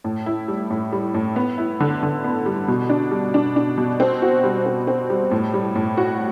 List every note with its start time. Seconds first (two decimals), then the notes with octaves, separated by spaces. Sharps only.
0.04 A2
0.26 E4
0.48 G3
0.70 A2
0.93 G3
1.14 A2
1.36 B3
1.58 E4
1.80 D3
2.03 D3
2.24 B3
2.46 G3
2.68 B2
2.89 D4
3.11 G3
3.34 D4
3.56 D4
3.78 B2
4.00 C4
4.22 F#4
4.44 G3
4.66 C4
4.87 C4
5.10 G3
5.31 A2
5.54 G3
5.75 A2
5.97 F#4